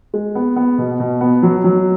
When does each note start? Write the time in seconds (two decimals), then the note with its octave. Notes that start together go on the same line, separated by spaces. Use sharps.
0.14 G#3
0.35 B3
0.56 B3
0.78 B2
1.00 B2
1.21 B3
1.43 F#3
1.64 F#3